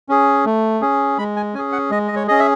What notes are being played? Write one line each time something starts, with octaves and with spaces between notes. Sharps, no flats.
C#4 G#4
A3
C#4 G#4
G#3 B5
G#5
C#4 G#4 G#5
F#5
G#3 D#5
D#5
C#5
C#4 G#4 D#5
E5